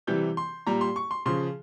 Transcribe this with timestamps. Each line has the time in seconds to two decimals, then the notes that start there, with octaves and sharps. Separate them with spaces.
0.07 C3 E3 G3 G6
0.37 C6
0.67 A#2 G3 A#5
0.81 C6
0.96 C#6
1.11 C6
1.26 C#3 F3 C6